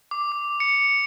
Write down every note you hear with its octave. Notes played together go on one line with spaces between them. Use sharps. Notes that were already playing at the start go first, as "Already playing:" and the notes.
D6
D6
C#7